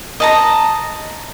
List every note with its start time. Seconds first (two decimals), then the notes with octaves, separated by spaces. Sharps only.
0.20 D#5 A5 A#5